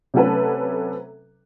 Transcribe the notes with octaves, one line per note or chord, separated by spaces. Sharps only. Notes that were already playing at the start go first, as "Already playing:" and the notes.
C3 F#3 A3 C#4 A4 B4